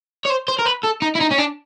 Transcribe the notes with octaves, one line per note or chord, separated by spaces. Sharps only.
C#5
C5
C5
A#4
B4
A4
D#4
E4
D#4
C#4
D4